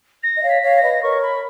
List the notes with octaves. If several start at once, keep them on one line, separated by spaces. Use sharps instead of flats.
A#6
D#5
C#5 F5
B6
C#5 F5
A#6
B4 D#5
A#4 C#5 C#6
B5